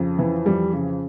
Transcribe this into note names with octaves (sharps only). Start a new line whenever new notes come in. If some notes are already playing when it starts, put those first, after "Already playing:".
Already playing: F2 C#3
E3
F2 G3
C#3